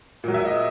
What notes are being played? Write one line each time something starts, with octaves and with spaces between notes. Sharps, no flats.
A#2 F#3
E5
D#5